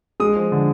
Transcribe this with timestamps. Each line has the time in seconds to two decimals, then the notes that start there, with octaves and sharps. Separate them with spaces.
0.20 G#3 D#6
0.36 F3
0.52 D3